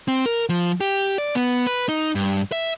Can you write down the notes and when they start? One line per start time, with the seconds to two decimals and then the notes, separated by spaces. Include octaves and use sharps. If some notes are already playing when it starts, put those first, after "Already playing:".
0.08 C4
0.26 A#4
0.49 F3
0.81 G4
1.18 D5
1.35 B3
1.67 B4
1.89 D#4
2.15 G2
2.52 E5